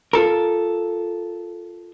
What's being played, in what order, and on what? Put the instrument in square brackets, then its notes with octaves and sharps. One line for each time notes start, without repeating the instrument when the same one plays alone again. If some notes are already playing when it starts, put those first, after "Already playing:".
[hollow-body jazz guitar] F4 A4 A#4